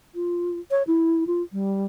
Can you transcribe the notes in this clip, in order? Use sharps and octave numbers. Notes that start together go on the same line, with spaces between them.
F4
C#5
E4
F4
G3